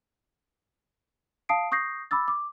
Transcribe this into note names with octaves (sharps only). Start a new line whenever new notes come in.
F5 A5 D#6 C7 D7
C#6 D#6 G6 A#6 C7
B5 D6 E6 A6
D6